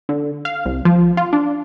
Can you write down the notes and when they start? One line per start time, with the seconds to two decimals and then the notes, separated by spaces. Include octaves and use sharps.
0.09 D3
0.45 F5
0.65 C2
0.85 F3
1.17 F4
1.33 D4